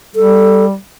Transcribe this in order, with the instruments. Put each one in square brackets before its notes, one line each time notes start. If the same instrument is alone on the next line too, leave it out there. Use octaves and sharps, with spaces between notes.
[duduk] G3 [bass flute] A4